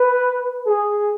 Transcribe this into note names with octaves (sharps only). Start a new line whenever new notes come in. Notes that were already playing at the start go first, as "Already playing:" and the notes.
Already playing: B4
G#4